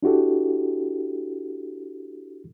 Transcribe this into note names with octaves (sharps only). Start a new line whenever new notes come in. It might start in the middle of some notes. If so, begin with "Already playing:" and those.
D4 E4 F#4 G4 A4